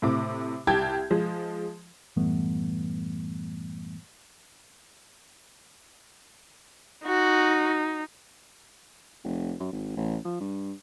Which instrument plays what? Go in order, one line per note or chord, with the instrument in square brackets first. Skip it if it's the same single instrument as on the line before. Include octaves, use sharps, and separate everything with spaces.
[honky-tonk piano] A2 C3 D6
C2 G4 G5 A5 G6 G#6
F3 G#3
[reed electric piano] F#2 A2 E3 G3 A3 B3
[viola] D#4 [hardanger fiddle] F#4
[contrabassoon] F1
F#2
G#1
A1
F3
G2